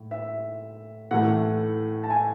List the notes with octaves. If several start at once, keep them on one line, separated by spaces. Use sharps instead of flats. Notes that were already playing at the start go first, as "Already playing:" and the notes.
Already playing: A2
E5
A2 E3 A3 F#5
A5
G#5